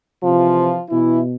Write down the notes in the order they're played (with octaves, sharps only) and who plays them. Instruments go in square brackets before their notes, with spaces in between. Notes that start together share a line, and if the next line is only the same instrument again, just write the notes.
[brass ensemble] C3 E3 F3 F4
B2 E3 E4